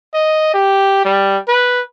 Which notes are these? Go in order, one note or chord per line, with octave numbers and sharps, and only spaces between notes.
D#5
G4
G3
B4